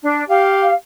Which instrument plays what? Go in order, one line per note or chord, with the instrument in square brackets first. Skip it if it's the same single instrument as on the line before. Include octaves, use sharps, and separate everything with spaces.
[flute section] D4
[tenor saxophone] G4 [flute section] F5